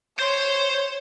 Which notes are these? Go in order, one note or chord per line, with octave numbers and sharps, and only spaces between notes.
C5 C#5 C6